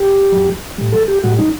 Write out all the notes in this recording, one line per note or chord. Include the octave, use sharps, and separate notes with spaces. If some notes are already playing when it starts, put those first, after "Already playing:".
Already playing: G4
F#2 F#3
A2 G3
A4
G4
A2 G3 F#4
D#4